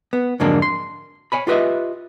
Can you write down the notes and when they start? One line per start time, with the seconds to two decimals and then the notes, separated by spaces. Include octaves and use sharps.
0.13 B3
0.40 F2 G#2 D3 F#3 A#3 D4
0.62 C6
1.32 C#5 G#5 B5
1.47 F4 G4 B4 D#5 E5